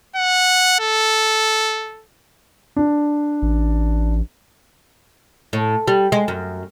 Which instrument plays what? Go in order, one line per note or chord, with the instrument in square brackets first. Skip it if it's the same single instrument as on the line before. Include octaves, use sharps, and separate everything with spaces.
[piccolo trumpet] F#5
A4
[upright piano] D4
[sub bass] A1
[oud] A2
G3
G#3
F#2